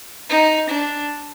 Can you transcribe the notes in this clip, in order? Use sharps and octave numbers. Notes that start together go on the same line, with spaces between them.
D#4
D4